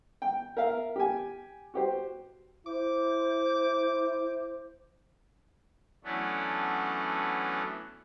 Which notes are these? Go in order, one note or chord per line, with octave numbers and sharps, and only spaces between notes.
G5
A#4 E5 F5
G4 G#5
F#4 G4 C5
E4 C5 D6
E3 F#3 A3 B3 C#4 D4